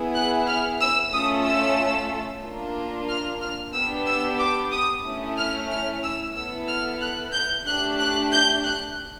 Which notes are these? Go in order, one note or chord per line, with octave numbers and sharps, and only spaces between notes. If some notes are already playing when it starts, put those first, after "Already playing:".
Already playing: B3 E4 G#4
F#6
F6
E6
A3 C#4 F4 A4 D#6
E6
A#3 D4 F4
F6
F6
B3 D4 G4 E6
E6
D6
D#6
A3 C#4 E4
F6
F6
E6
B3 E4 A4 E6
F6
F#6
G6
A3 D4 G4 F#6
F#6
G6
F#6